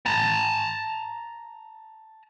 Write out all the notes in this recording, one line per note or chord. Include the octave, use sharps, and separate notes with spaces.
A5 A#5